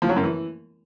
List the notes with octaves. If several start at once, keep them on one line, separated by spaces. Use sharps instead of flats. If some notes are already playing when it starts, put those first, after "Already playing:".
F3
F#3
F#2
E3